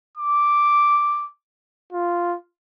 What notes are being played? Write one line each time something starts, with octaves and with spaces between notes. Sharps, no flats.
D6
F4